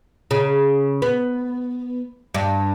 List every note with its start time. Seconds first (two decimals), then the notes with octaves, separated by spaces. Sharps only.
0.31 C#3
1.02 B3
2.34 G2